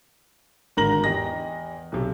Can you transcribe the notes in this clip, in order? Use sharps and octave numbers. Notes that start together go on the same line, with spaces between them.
G#1 D3 A#4 A#5 A#6 F#7
E2 G4 D#5 A#6
B1 C3